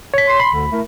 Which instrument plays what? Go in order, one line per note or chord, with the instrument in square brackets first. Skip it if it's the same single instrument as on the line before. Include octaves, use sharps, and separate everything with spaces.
[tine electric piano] C#5 B6
[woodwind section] C6
[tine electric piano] B5
[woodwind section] D2 D3
A3 E4 A#4